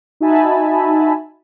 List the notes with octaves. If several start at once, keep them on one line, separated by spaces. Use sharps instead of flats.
D#4 F#4 E5 G#5 A5 B5